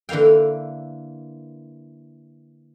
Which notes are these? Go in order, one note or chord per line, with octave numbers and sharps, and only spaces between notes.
D3 E3 A#3 F5 G5